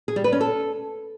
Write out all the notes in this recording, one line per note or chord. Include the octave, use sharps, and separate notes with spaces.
G#4
G3
B4
C#4
A4